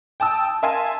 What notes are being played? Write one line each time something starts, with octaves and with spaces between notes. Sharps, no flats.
G5 A5 D#6 E6
A#4 E5 F5 G#5 A5 C6